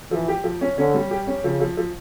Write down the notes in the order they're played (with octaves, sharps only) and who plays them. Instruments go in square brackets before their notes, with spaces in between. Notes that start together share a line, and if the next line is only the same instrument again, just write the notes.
[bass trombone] E3 [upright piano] F3
[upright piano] G4
F3
C#4
[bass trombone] D3 [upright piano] C#4
[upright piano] G3
G4
C#4
[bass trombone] C#3 [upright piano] F3
[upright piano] F3
F3